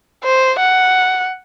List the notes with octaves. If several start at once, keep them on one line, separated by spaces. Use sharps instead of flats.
C5
F#5